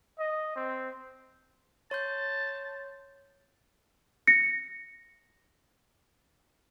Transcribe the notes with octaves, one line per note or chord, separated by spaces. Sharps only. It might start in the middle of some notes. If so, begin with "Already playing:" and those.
D#5
C4
C#5 A5 C6 G6
A#6 C#7